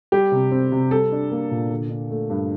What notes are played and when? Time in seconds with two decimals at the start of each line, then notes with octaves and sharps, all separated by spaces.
0.12 G3 G4
0.32 C3
0.51 C4
0.72 C3
0.91 G3 A4
1.12 D4
1.32 A#3
1.51 A#2
1.71 D3
1.90 D4
2.10 A3
2.30 G2